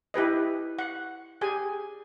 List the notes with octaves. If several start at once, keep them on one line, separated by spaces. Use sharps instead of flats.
E4 G4 B4 D#5
F#5
G4 G#4 G#5